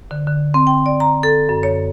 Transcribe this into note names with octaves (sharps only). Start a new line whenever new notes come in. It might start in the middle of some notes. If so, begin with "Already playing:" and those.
D3
D3
C4
G5
D5
A#5
A4
F#2
C#5